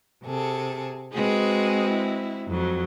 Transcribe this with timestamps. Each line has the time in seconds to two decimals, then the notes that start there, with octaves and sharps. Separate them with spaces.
0.24 C3 G#4 A4
1.12 G#3 C4 F#4 G#4 B4
1.89 E4
2.48 F2 F#3